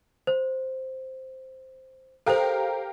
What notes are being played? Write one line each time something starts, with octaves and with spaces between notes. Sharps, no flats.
C5
G4 A4 A#4 C5 F5